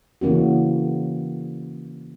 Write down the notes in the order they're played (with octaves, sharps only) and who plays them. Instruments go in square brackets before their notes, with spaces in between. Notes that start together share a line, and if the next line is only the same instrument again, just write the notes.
[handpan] C#3 E3 A#3 C#4 F#4